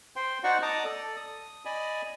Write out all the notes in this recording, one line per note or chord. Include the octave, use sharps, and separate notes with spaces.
C5 G5 C6
D#4 F#4 C5 D5 F#5 C#6
D5 D#5 A5 A#5 D6 D#6
A4 D5
D#6
D5 D#5 G#5 B5